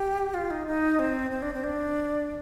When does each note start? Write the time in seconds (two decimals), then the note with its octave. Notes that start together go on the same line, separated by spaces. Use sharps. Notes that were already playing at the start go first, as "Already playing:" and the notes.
Already playing: G4
0.34 F4
0.51 D#4
0.67 D#4
0.99 C4
1.31 C4
1.42 D4
1.53 C4
1.64 D4